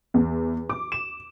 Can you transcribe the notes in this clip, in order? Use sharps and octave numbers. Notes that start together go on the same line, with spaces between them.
E2
D6
E7